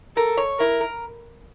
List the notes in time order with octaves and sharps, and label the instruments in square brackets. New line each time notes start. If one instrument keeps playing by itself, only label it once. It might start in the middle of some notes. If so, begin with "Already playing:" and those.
[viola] A4 [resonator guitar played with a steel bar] A#4
[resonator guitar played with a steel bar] C#5
[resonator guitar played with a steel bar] E4 [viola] A#4
[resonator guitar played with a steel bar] A#4